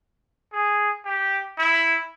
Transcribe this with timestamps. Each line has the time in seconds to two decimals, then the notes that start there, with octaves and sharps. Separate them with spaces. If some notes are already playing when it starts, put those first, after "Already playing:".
0.53 G#4
1.05 G4
1.58 E4